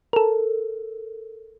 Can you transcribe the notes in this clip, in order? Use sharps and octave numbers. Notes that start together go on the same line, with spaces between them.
A4 A#4